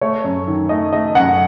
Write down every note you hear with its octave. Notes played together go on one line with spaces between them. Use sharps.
A3 C#5
F#2
D#3
A3 D#5
A3 D#5
F#2 F#5